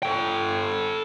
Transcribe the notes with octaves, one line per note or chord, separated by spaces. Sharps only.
A4 G5